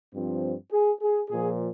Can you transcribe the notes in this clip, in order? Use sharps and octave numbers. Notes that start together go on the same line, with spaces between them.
G2 F3 C4
G#4
G#4
A#2 F3 G#4